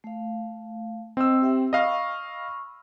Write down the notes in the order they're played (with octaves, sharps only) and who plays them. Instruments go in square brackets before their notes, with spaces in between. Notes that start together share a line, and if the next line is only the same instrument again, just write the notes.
[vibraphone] A3 F5
[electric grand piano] C4 E6 [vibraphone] D#5
[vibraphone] G4 E5 G5
[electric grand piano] D#5 F5 F6 [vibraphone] B5 C#6